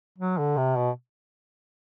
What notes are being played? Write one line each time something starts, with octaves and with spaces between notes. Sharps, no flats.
F#3
D3
C3
B2